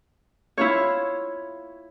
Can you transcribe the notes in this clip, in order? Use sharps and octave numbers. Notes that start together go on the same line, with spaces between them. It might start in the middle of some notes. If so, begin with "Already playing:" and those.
E4 F4 C#5